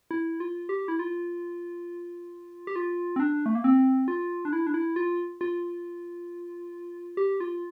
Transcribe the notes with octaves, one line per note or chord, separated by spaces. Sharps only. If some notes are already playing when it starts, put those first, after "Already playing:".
E4
F4
G4
E4
F4
G4
F4
C4
D4
A3
A#3
C4
F4
D4
E4
D4
E4
F4
F4
G4
F4